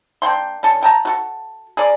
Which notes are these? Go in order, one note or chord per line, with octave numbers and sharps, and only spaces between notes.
A#3 D4 G5 C6
D3 C#4 A4
G5 A5 A#5
F#4 A4
G#4 A#4 D5